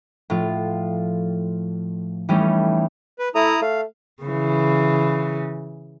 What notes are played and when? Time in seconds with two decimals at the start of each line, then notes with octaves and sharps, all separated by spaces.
0.30 A2 F3 F4
2.29 E3 G3 A3 C#4 D#4
3.19 B4
3.35 A3 E4 A#5 D#6
3.62 A3 F5
4.23 C#3 E3